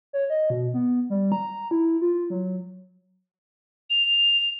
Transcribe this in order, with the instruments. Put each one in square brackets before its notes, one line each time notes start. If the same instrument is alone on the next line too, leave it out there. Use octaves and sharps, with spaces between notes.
[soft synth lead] C#5
D#5
B2
B3
G3
A#5
E4
F4
F#3
[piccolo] F7